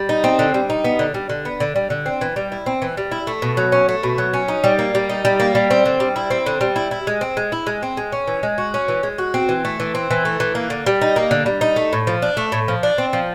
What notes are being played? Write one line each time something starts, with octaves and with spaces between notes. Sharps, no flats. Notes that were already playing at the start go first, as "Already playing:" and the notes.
Already playing: G3
D#4
C4
D3
G3
D#4
B3
D3
G3
D3
B3
D3
G3
D3
C4
E3
G3
E4
C4
E3
G3
E4
A3
B2
F#3
C#4
A3
B2
F#3
C#4
D#4
G3
A#3
G3
D#4
G3
A#3
G3
C4
D3
G3
E4
C4
D3
G3
E4
E4
G#3
C4
G#3
E4
G#3
C4
G#3
C#4
E3
G#3
F#4
C#4
E3
G#3
F#4
C4
E3
A3
E3
C4
E3
A3
E3
A#3
D3
G3
D#4
A#3
D3
G3
D#4
A3
A2
F3
D4
A3
A2
F3
D4
C4
F3